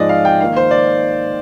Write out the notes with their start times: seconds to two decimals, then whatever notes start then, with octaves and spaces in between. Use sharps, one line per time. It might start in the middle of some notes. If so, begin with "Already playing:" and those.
Already playing: G#2 F3 G#3 D5 D#5
0.09 F5
0.25 G5
0.40 D#3 A#3 D#4 F5
0.57 C5
0.71 D5